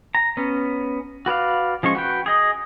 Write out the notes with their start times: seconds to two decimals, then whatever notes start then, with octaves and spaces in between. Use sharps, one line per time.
0.15 A#5
0.37 B3 C#4
1.26 F#4 B4 D5 F5
1.83 F3 G#3 C#4 C#6
1.95 F#4 B4 G5
2.26 G#4 D#5